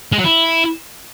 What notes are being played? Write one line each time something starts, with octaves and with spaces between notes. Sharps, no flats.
G#3
F#3
E4